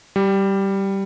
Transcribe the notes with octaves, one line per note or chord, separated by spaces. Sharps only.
G3